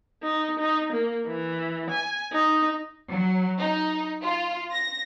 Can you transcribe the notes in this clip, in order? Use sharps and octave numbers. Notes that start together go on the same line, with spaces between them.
D#4
D#4
A#3
E3
G#5
D#4
F#3
D#4
F4
A#6